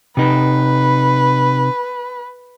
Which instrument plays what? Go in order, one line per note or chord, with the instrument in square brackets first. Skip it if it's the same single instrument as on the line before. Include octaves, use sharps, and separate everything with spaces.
[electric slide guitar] C3 D#4 [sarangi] B4